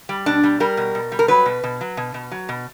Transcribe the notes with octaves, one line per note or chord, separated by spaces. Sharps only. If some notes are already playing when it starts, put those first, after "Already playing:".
G3
B2 D4
G3
G3 A#4
B2
B2
G3
A#4
F#3 B4
B2
B2
F#3
B2
B2
F#3
B2